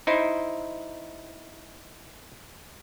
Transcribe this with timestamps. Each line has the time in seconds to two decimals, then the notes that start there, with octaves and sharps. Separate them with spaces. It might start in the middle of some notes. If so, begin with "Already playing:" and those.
0.07 D#4 E4 C5